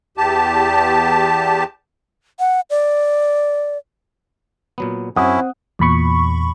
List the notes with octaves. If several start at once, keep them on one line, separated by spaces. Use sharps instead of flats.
E2 G4 A5
F#5
D5
A#2 F#3 B3
F#2 C4 C#4 E4 F#5 D#6
E2 A#2 B5 C#6